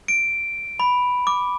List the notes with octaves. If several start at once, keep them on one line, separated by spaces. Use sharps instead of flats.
D7
B5
D6